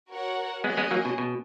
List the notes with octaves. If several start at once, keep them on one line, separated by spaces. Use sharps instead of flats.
F#4 A#4 C#5 F#5
G#3 B3 C#4 G#4 D#5
G#3 B3
F#3 A#3
B2
B2